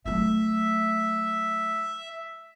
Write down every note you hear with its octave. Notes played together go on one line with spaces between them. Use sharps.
F#3 A3 E5